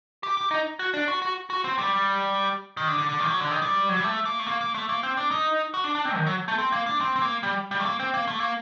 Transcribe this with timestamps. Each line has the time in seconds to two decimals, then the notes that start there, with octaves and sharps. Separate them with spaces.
0.23 G4
0.37 G4
0.51 D#4
0.79 F#4
0.94 D4
1.08 F#4
1.22 F#4
1.50 F#4
1.64 C4
1.78 G3
2.77 D#3
2.88 D3
2.98 D3
3.09 D3
3.20 D#3
3.26 G3
3.30 F#3
3.41 D3
3.51 D#3
3.62 G3
3.89 F#3
3.97 G3
4.04 A3
4.25 A#3
4.39 A3
4.47 A#3
4.61 A#3
4.75 A3
4.89 A#3
5.03 C4
5.17 D4
5.31 D#4
5.74 F#4
5.84 D4
5.95 D4
6.05 C4
6.16 D#3
6.26 F#3
6.48 A3
6.58 C4
6.72 A#3
6.86 D4
7.01 C4
7.16 C4
7.22 A#3
7.43 G3
7.71 G3
7.80 A3
7.85 A#3
7.99 C4
8.14 A#3
8.27 A3
8.40 A#3